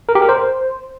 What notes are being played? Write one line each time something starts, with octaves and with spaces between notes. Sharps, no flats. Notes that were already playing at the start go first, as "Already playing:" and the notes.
A#4
G4
A#4
C5